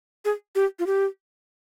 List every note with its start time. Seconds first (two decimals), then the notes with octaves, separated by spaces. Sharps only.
0.25 G#4
0.55 G4
0.79 F4
0.87 G4